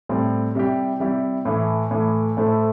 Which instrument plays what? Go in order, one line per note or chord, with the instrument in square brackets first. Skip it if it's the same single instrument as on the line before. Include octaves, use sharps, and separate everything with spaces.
[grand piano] A2 G3 C4
C3 G3 E4 G4
C3 G3 E4 G4
A2 E3 A3
A2 E3 A3
A2 A3 E4 A4 C5